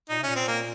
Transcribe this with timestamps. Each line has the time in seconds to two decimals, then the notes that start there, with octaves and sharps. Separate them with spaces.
0.09 A#2 D#4
0.19 C3
0.23 A#2 C#4
0.36 C4
0.48 A#3